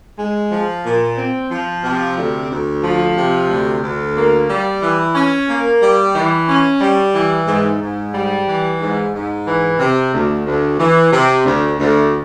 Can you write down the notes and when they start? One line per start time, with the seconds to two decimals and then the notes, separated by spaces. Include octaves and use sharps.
0.19 G#3
0.51 F3
0.84 A#2
1.17 C4
1.50 F3
1.84 C3
2.17 D2
2.50 D2
2.83 F3
3.17 C3
3.50 D2
3.83 D2
4.16 A#3
4.50 G3
4.82 E3
5.15 C#4
5.49 A#3
5.81 G3
6.15 E3
6.48 C#4
6.81 G3
7.15 E3
7.47 G#2
7.81 G#2
8.14 G3
8.48 E3
8.80 G#2
9.14 G#2
9.47 E3
9.80 C3
10.14 D2
10.46 D2
10.80 E3
11.13 C3
11.46 D2
11.79 D2